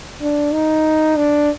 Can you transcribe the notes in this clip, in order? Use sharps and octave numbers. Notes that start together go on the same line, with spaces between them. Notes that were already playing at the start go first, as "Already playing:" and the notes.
D4
D#4
D4